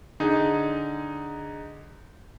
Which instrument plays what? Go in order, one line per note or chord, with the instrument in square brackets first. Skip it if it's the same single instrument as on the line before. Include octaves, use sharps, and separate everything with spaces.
[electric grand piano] D3 D#4 G#4